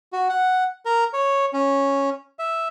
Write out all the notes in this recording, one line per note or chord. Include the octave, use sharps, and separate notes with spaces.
F#4
F#5
A#4
C#5
C#4
E5